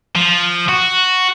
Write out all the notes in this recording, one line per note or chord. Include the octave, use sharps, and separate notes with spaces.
F3
F#4